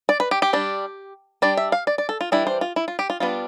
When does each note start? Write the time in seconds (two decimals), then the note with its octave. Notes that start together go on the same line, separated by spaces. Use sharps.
0.09 D5
0.20 B4
0.31 G4
0.42 G4
0.53 G3 D4
1.42 G3 D4 D5
1.57 E5
1.72 F5
1.87 D5
1.98 D5
2.09 A4
2.21 F4
2.32 E3 G3 D4 E4
2.47 C5
2.61 F4
2.76 E4
2.88 F4
2.99 G4
3.10 F4
3.20 G3 B3 D4 F4